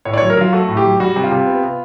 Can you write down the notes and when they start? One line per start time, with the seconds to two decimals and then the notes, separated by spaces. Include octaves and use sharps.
0.05 A2 C#5
0.14 D5
0.18 C#5
0.21 F#3
0.30 A#4
0.37 F#3 F4
0.53 A3 F#4
0.68 A2
0.77 G4
0.84 F#3
1.00 G3 F#4
1.16 C3
1.24 F4
1.31 C3
1.47 B3
1.63 B3